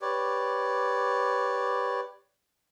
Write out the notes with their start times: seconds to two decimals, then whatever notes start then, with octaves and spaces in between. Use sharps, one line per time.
0.02 G4 B4 C#5 D5